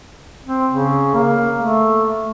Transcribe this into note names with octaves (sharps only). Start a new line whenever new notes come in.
C4
C#3
A#3
A3